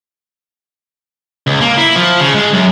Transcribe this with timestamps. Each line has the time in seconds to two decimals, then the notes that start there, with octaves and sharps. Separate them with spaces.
1.47 C#2
1.61 A#3
1.78 E4
1.96 F3
2.21 C#3
2.34 G#3
2.53 F#2